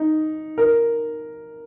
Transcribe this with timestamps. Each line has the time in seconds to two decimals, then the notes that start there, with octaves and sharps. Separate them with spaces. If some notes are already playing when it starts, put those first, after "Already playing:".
Already playing: D#4
0.58 A#4